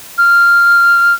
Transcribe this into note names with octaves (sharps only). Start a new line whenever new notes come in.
F6